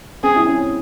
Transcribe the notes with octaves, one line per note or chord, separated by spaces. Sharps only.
C4 G#4
E4
C#4